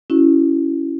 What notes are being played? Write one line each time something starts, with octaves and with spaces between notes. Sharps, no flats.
C#4 E4 F#4